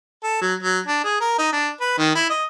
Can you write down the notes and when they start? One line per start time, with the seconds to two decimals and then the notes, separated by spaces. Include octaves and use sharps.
0.23 A4
0.41 F#3
0.63 F#3
0.86 D4
1.04 G#4
1.21 A#4
1.38 D#4
1.53 D4
1.80 B4
1.98 D#3
2.15 E4
2.29 D#5